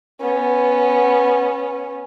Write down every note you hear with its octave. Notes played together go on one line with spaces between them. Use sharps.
B3 C#4